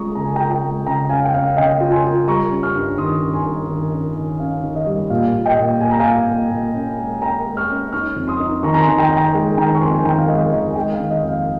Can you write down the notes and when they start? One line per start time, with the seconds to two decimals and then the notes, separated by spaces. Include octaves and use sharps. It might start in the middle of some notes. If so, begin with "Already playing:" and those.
Already playing: G#3 C#4 F4 A#5 C#6 D#6
0.15 C#3 A#5
0.25 G#5
0.36 F4 G5 A#5
0.51 G5 A#5
0.63 G#3
0.86 C#3 G5 A#5
1.09 C#4 F5 G#5
1.24 G5
1.34 C#4 F5
1.49 F5
1.56 C#3 D#5 G5
1.81 F4
1.92 G#5 C6
2.04 F4
2.27 G3 A#5 C#6
2.51 C#4
2.63 C#6 F6
2.75 G2
2.98 D#3 C6 D#6
3.21 C#4
3.33 G#5 C6
3.45 G2
3.70 D#3
3.93 C#4
4.16 D#3
4.40 C#4 F5
4.63 D#3
4.75 D#5
4.87 G3
5.10 A#2 F5
5.34 A#2
5.46 D#5 G5
5.58 A#2
5.80 A#2 G#5
5.91 A#5
6.00 A#2 F5 G#5
6.28 A#2
6.52 A#2
6.75 C#4
6.99 G#3
7.22 C#4 G5 A#5
7.46 G#3
7.57 C#6 F6
7.70 C#4
7.93 D#4 C#6 F6
8.16 F2
8.28 C6 D#6
8.40 D#4
8.63 D#3 A#5 C#6
8.74 A#5
8.81 G#5 C6
8.88 D#3
8.98 G5 A#5
9.10 D#3
9.17 G5 A#5
9.34 G#3
9.57 D#3 G5 A#5
9.75 C#6
9.81 F2 G#5 C6
9.94 G#5
10.04 D#3 G5 A#5
10.18 F5
10.28 G#3 D#5 G5
10.51 D#3 D#5
10.70 G#5
10.75 G#3 D#5 G5
10.93 F5
10.99 D#3
11.10 D#5
11.23 F2
11.28 F5